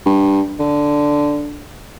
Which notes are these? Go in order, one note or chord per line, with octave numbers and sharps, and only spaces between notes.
G2
D3